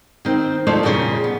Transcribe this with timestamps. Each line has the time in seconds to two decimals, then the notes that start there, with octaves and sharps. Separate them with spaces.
0.25 D#3 C4
0.67 F3 A3 D#4 E4 C5 D5
0.83 F2 A#2 C#3 G3 C#4
1.24 B3